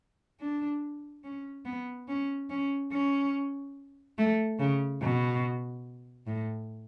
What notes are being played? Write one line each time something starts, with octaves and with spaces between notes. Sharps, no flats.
D4
C#4
B3
C#4
C#4
C#4
A3
C#3
B2
A2